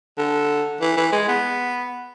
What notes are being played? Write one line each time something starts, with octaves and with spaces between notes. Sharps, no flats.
D3
E3
E3
G#3
B3